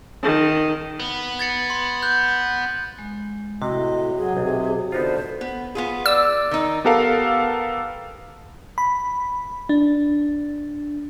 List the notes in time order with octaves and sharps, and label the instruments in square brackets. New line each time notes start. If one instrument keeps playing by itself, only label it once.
[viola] D#3
[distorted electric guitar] B3
[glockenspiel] G#6 A6 C#7
C6
F#6 G6
[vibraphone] G#3
[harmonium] A2 [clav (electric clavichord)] C3 [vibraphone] F#4 [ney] D#5
[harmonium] F#3 [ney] G#4
[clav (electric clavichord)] B1 [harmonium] C3
[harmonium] D3 [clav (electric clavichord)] B3 D#4 F4 [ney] C5
[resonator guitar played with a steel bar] B3
B3 F4 G#4
[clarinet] D5 [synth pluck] E6
[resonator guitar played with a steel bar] D#3 D#4
[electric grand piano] B3 G4 A4 A#4 F5
[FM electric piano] B5
D4